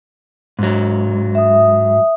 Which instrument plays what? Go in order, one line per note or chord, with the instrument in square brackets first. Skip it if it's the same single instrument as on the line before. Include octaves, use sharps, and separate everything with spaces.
[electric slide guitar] G#2 F#3
[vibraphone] E5 D#6